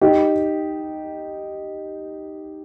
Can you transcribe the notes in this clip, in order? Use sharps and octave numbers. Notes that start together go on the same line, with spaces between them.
D#4 G4